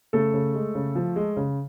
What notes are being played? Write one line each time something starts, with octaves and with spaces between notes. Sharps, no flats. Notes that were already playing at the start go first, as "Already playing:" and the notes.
C#3 A3 A4
C#3
G#3
C#3
F3
G#3
C#3